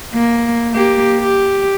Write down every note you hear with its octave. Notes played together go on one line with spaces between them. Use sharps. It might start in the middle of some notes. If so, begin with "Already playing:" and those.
A#3
A#3 G4
G4